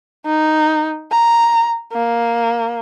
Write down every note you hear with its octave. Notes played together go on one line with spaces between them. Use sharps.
D#4
A#5
A#3